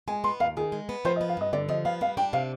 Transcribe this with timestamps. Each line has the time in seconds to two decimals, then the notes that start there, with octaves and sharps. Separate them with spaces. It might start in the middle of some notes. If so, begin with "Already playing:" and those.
0.08 G#3 G#5
0.24 B3 C6
0.40 D#2 F5
0.57 D#3 G#4
0.72 G#3
0.89 B3
1.05 F3 C5
1.16 D#5
1.21 B3
1.29 F5
1.37 G2 D#5
1.53 D3 D5
1.69 F3 D#5
1.85 B3 F5
2.01 G3 F5
2.17 D4 G5
2.33 C3 F5